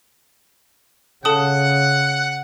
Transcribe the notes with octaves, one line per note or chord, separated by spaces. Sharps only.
C#3 A4 F#5 A5 D#6